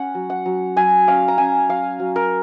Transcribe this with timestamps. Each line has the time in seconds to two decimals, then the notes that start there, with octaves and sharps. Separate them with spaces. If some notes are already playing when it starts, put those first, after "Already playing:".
Already playing: C#4 F#5
0.15 F#3
0.30 F#5
0.46 F#3
0.76 F#3 G#5
1.07 C#4 F5
1.28 A#5
1.38 C#4 G#5
1.69 F#3 F5
2.00 F#3
2.16 A#4